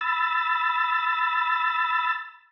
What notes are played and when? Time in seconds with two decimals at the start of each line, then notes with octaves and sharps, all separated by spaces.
0.01 B5 E6 A6